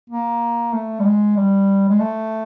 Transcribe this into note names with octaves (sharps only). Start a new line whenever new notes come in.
A#3
A3
G3
G#3
G3
G#3
A3